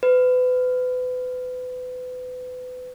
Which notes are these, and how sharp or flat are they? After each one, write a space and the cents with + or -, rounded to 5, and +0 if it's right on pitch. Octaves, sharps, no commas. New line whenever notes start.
B4 +30